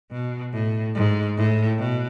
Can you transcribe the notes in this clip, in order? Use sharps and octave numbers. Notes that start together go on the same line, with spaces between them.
B2
A2
G#2
A2
B2